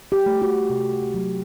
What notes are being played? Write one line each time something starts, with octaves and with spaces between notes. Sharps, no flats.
G4
A3
F#4
C3
F#3 A3